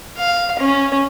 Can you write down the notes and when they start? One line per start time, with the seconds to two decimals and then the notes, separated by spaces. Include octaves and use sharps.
0.18 F5
0.59 C#4